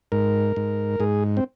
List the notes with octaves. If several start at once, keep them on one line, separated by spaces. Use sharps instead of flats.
G#2 A#4
G#2
G#2 G#4
C4